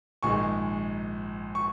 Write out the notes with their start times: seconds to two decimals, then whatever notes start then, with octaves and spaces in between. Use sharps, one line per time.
0.23 A#1 G#2 D#3 G#3 G#5 C#6
1.55 C#6